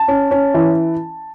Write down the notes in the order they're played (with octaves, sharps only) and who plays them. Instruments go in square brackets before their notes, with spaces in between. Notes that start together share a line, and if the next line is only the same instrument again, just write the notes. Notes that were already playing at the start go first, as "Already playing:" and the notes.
Already playing: [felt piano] A5
C#4
C#4
E3